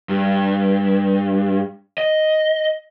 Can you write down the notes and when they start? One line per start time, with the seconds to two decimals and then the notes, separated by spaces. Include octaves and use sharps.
0.09 G2
1.98 D#5